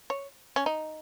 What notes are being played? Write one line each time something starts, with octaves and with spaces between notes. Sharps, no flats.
C#5
C#4
D#4